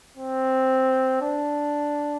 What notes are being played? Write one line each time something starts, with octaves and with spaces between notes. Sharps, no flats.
C4
D4